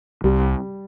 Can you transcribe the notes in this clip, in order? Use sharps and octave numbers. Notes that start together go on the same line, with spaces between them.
C2 G3